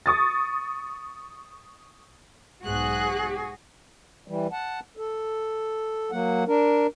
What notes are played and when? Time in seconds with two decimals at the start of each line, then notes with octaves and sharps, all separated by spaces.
0.06 C#6 D#6 A6
2.64 B1 G#2 F#4 G#4 F#6
4.28 E3 G3
4.52 F#5 A5
4.97 A4
6.12 F#3 A#3 F#5
6.48 D4 A#4